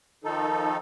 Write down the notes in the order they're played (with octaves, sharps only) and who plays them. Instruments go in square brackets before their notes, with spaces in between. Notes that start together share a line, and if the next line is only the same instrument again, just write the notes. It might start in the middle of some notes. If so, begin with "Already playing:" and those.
[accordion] D#3 F3 D#4 A4